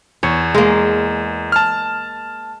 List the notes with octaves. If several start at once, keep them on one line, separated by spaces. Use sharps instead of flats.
E2 C#5
G#3 A#3
A5 F6